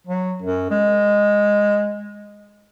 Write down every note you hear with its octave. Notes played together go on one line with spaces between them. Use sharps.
F#3
F#2
G#3